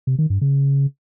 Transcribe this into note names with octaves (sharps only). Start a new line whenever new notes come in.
C3
D#3
G2
C#3